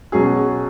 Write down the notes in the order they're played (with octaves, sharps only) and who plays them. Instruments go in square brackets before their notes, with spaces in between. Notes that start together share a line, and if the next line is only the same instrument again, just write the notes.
[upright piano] B2 F#3 C#4 G#4